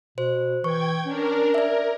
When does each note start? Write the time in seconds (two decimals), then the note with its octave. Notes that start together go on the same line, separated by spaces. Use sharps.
0.18 B2 C5
0.64 E3 G5 C#6 G#6
1.06 C#4 D4 A#4
1.54 A#4 D5 E5